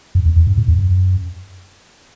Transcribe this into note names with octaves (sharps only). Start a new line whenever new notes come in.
F#2
E2
E2
G2
A2
E2
F#2